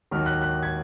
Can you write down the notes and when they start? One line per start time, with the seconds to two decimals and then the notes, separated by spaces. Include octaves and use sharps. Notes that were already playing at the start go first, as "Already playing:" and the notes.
0.11 D#2 D#3 F#3 F6
0.26 F#6
0.42 F#6
0.63 G#6